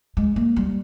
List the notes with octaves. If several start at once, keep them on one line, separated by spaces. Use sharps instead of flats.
G#3
A#3
G3